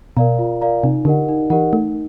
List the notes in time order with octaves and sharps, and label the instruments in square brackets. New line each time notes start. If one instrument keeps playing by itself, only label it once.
[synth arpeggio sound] B2 [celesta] A#4 D5 F5 A#5
[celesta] F4
A#4 D5 F5 A#5
[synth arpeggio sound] C3 [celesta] D#4
[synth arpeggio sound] D3 [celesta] G4 A#4 D#5 F#5
[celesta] D#4
[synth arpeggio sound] E3 [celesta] G4 A#4 D#5 F#5
[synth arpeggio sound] A3 [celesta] D#4